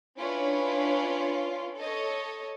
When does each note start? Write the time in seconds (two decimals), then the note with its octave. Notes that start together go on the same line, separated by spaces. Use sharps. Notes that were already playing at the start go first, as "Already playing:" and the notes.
0.16 C#4 D4 E4 F4 B4 C#5
1.77 A4 C#5 D#5